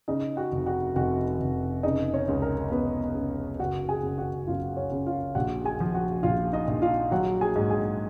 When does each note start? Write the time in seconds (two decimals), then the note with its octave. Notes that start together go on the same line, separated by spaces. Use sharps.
0.08 C#3 D#4 D#5
0.37 F#4 F#5
0.52 F1
0.66 F#4 F#5
0.95 F1 F#4 F#5
1.39 F1
1.83 C#3 D#4 D#5
2.13 C#4 C#5
2.28 C#2
2.42 A#4
2.71 C#2 B3 B4
3.15 C#3
3.59 F#1 F#4 F#5
3.89 G#4 G#5
4.03 C#3
4.18 F#4 F#5
4.47 F#2 F4 F5
4.77 C#4 C#5
4.91 C#3
5.06 F4 F5
5.35 A#1 F#4 F#5
5.65 G#4 G#5
5.80 F3
5.94 F#4 F#5
6.23 A#1 F4 F5
6.53 D#4 D#5
6.67 A#1
6.82 F4 F5
7.11 F#3 F#4 F#5
7.41 G#4 G#5
7.56 G#2
7.70 G#4 G#5